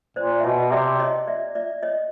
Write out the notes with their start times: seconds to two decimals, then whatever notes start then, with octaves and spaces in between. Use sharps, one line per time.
0.16 A#2 C5 D5
0.40 E5
0.44 B2 C#5 D#5
0.72 C3 D5 E5
0.99 C#5 D#5
1.27 D5 E5
1.55 D5 E5
1.83 C#5 D#5